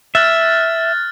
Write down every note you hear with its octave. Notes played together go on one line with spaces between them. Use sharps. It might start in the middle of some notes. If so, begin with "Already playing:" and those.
E5 F6 F#6 A6